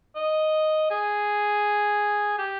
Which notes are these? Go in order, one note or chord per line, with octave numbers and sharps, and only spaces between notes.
D#5
G#4
G4